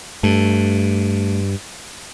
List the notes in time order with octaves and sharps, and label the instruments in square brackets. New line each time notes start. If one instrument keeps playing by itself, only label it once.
[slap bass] G2 [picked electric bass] A3